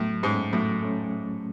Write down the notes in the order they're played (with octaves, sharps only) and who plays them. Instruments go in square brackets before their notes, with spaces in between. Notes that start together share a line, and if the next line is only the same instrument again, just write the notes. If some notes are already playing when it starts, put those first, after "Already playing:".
Already playing: [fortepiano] A2 [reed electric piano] F#3
[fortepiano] G#2 [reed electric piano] A3 C#4
[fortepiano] A2 [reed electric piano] F#3
[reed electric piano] A3 C#4